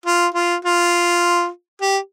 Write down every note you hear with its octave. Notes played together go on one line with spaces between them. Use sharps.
F4
F4
F4
G4